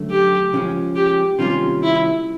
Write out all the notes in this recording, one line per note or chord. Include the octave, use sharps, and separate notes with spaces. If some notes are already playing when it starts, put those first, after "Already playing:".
Already playing: F#2 D3 F#3 A3
G4
C#2 C#3 F3 G#3 C#4
G4
C3 D#3 G3 A#3 C#4 F4
E4